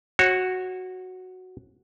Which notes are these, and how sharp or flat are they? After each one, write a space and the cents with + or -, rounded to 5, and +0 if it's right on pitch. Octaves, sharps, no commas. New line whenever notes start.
F#4 +0 C#5 -30